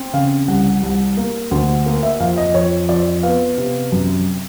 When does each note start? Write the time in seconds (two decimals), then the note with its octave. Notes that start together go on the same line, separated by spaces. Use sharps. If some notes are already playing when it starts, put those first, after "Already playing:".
Already playing: C4
0.13 C#3 F5
0.48 C2 F#5
0.83 C2
1.17 A#3
1.51 D2
1.86 A#3
2.03 E5
2.20 F2 F5
2.37 D#5
2.54 F2 C#5
2.89 F2 D5
3.23 B3 F5
3.58 C3
3.92 F#2